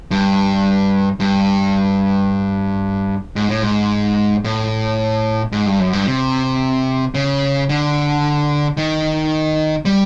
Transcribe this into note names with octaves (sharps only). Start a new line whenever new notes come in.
G2
G2
G#2
A2
G#2
A2
G#2
G2
F#2
G2
C3
C#3
D3
D#3
G3